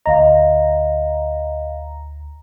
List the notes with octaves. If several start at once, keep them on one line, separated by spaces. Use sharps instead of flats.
D2 D#5 F5 A#5